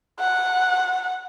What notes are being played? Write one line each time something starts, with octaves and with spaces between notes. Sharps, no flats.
F#5